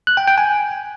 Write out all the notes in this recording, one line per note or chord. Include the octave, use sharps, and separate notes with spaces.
F#6
G5
G5
G#5